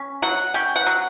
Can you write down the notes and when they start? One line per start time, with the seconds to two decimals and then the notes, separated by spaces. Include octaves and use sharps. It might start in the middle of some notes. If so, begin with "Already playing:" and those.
Already playing: C#4
0.22 F#3 F#5
0.54 C#4 G5
0.76 F#5
0.86 F#3